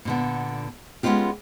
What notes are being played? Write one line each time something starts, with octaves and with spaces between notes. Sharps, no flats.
A#2 D3 B3
G#3 B3 C#4 D#4 F4 G4